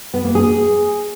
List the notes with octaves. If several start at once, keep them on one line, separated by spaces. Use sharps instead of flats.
B3
A#3
G#4